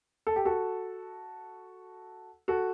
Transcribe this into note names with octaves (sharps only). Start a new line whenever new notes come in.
A4
G4
F#4 A4
F#4 A4